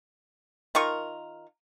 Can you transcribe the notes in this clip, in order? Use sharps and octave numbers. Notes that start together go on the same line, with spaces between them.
D#3 F4 A#4 C#6